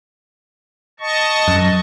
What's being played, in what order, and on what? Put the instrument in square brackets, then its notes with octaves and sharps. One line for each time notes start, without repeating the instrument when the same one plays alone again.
[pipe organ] D#5 A5 C#6
[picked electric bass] F#2